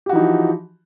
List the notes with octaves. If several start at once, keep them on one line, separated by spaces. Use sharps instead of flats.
E3 F3 D#4 F#4 G4